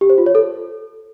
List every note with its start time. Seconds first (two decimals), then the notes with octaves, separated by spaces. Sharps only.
0.01 G4
0.10 C5
0.18 F4
0.26 C#5
0.35 A4